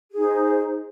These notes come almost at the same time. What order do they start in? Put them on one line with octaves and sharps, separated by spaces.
G#4 D#4 C5